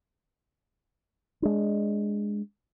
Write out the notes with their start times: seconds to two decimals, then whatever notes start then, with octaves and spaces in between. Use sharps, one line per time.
1.42 G#3 D4